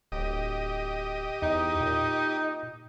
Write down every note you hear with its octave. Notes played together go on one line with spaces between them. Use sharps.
D1 G4 D#5
E2 D#4
A#2